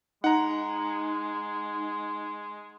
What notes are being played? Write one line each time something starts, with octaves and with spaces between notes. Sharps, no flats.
G#3 D#4 F#5 A#5